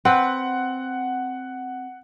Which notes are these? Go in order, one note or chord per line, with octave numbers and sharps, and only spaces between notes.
C4 B4 F#5